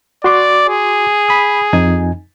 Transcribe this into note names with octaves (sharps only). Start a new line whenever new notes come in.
F#4 D5 C6 D6
G#4
B5 D#6
F2 D#4 G#5